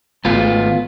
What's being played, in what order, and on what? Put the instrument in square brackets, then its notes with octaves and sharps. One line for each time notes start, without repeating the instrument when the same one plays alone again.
[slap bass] G#1 A3 [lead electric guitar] B3 F4